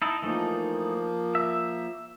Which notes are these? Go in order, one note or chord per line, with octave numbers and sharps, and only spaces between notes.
D#4 E4 A5
E3 F3 A3 A#3 D#4
E5